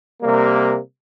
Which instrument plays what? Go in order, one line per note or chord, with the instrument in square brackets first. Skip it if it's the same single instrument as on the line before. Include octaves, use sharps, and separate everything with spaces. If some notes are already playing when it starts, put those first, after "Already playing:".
[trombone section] C3 G3 A#3